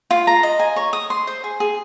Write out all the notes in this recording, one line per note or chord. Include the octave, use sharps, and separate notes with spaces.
F4
A#5
D#5
G#5
C#5
D#6
C6
C5
G#4
G#4